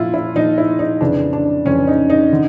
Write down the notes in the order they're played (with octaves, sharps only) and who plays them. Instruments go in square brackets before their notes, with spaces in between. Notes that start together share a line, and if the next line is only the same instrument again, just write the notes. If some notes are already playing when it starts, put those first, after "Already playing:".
Already playing: [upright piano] A#2 F3 E4 F4
E4
A#2 F3 D#4
E4
D#4
F2 C#3 E3 D4
D4
F2 C#3 E3 C#4
D#4
D#4
D3